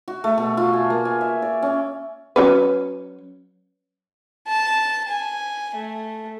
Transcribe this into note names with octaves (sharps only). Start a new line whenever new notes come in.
F#4
A3
B2
F4
G#5
A#3
G#5
E5
D5
C#4
F#3 C#4 B4
A5
G#5
A3